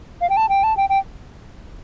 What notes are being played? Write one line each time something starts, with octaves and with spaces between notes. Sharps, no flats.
F5
G5
A5
G5
A5
G5
G5